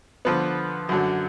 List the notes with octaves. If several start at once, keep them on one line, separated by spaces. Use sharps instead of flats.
D3 F3 B3
F#2 D3 F#3